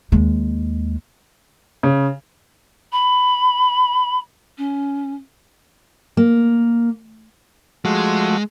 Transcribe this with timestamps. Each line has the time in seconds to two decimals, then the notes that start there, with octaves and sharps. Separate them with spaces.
0.12 D#2 G#3
1.83 C#3
2.92 B5
4.58 C#4
6.17 A#3
7.85 F3 G#3 A3 F#4